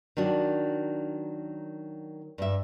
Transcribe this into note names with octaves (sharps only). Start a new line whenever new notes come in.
D#3 F#3 D4 F#4
G2 D4 E5